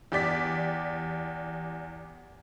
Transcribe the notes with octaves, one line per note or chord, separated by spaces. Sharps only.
E2 G4 D5 B6